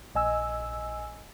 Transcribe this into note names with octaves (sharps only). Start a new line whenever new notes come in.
A#1 D#5 G#5 E6